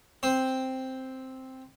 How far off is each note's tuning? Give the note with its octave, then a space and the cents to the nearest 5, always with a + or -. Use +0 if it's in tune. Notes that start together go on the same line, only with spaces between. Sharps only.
C4 +0 C5 +0